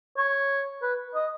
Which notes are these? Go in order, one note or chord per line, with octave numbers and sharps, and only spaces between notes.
C#5
B4
D#5